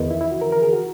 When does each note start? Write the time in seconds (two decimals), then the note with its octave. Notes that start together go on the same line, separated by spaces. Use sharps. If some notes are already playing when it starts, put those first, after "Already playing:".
Already playing: E2 D#3 E4
0.11 E4
0.21 E4
0.31 F#4
0.41 A#4
0.52 A#4
0.62 G#4
0.73 F#4